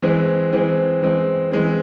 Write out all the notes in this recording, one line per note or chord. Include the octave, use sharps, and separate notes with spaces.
E3 G#3 C4
E3 G#3 C4
E3 G#3 C4
E3 G#3 C4